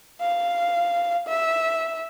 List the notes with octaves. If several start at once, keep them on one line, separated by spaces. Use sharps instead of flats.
F5
E5